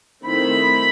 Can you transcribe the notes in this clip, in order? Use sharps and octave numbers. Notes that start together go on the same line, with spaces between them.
D#3 A3 C4 E4 B5